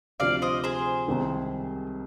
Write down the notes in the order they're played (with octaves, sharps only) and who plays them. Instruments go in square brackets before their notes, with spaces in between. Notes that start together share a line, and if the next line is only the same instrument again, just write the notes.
[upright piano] D2 C3 F3 [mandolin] D5 F5
[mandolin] C5 D#5
G#4 C5
[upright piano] C2 C3 D#3 G#3